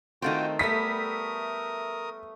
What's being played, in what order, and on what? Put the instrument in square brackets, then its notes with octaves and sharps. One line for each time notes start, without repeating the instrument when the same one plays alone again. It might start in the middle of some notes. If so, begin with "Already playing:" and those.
[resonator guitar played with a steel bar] D#3 A3 C4 [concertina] F4 F#4 G5
[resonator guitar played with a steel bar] G3 B3 [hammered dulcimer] A3 E5 [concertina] A#4 D#6 [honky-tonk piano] B6